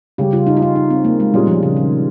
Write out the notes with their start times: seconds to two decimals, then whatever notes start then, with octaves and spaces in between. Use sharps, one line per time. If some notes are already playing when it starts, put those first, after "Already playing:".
0.18 C#3 G3 C#4 G4
0.33 F4
0.47 D#4
0.57 F4
0.62 D#4
0.75 D#4
0.90 C4
1.04 A#3
1.20 G#3
1.34 A#2 G3 G#3 C#4 F4 G#4
1.48 F3
1.63 C#3
1.76 D#3